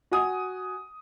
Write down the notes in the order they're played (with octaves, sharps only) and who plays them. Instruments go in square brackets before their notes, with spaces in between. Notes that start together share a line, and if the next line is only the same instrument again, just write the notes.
[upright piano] F#4 F#5 G#5 D#6